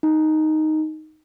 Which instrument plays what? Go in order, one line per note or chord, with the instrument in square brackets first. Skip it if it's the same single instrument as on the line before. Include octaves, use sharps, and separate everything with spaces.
[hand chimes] D#4